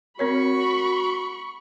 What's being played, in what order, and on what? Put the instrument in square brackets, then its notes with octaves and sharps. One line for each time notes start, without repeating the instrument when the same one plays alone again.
[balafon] C4 A#4 C#5 [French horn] F#4 [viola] B5 C#6